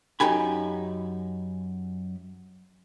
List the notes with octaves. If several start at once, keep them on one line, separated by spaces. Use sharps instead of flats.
F#2 D#4 G4 G#5 B5